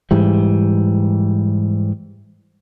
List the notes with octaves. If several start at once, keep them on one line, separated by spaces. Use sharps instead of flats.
G#2 E3 G3